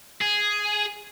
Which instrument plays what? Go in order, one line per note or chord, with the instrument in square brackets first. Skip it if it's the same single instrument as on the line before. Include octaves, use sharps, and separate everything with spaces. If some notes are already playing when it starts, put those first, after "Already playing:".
[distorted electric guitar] G#4